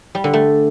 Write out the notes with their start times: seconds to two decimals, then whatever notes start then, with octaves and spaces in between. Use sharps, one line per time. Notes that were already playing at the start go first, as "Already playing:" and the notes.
0.15 G3
0.24 D3
0.33 A3